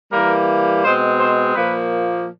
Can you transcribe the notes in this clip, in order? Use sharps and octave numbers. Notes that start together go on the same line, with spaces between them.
E3 G3 A#3 A#4
B2 G#3 C4 C5
C5
A#2 F3 A#3 B4